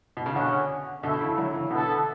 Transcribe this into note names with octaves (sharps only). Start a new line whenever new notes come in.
B2
C#3
B2 D3 C#4 G#4 C#5 F#5
B2 D3 A3 E4 A4 E5
C#3 E3
D3 F#3
C#3 E3
B2 D3 B3 E4 A4